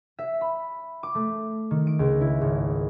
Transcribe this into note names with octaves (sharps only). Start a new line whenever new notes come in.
E5
B5
D6
A3
D#3
D7
C#2
E4
G#1